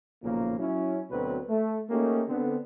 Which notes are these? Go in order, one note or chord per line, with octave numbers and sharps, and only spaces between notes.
B1 A#2 C#3 F3 A#3
F#3 C#4 E4
D2 B2 F#3 C4 B4
A3
A3 A#3 C#4 D#4 G4 G#4
D3 B3 C4